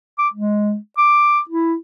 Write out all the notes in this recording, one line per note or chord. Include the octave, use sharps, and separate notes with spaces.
D6
G#3
D6
E4